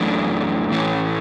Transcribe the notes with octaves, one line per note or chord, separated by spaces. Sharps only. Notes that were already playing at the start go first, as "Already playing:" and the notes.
Already playing: F#2 E3 A3 D4
A2 E3 A3 C#4